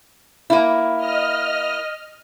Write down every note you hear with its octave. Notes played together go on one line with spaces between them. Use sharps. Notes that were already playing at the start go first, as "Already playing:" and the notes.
A#3 E4
D#5 F6